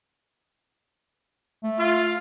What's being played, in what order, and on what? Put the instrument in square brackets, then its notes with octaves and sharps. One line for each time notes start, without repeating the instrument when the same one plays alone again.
[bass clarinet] A3
[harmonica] F4 F5